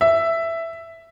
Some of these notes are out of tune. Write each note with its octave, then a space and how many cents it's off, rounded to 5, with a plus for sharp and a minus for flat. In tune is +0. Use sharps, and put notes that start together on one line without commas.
E5 +5